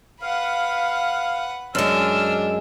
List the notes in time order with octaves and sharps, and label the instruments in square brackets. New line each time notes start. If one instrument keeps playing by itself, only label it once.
[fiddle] B4 F#5 [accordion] F5
[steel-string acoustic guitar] F#2 G#3 [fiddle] D4 [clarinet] E6 [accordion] F6